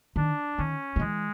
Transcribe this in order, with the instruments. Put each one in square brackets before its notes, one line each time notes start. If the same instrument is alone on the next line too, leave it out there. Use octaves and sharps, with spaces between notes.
[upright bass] D#3 [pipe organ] D4
[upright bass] D#3 [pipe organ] C#4
[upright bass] F3
[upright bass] E3 [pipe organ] G#3